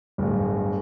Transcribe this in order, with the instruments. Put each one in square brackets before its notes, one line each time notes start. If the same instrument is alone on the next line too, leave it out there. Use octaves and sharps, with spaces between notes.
[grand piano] D1 G1